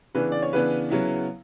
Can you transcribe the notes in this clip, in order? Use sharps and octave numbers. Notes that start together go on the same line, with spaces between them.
C#3 E3 B3 D4 B4
D5
C#5
C#3 E3 B3 D4 B4
C#3 F#3 B3 E4